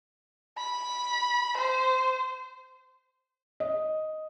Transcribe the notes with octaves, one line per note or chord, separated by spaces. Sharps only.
B5
C5
D#5